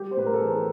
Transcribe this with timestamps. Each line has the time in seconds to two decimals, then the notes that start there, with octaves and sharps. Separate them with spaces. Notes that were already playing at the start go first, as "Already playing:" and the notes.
Already playing: G3 G4
0.11 C5
0.17 A2 B4
0.26 A#4
0.33 A4
0.40 E3 G#4